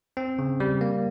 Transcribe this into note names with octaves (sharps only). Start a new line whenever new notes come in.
C4
C#3
G3
A#3